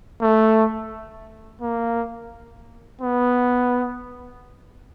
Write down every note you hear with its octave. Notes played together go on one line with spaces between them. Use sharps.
A3
A#3
B3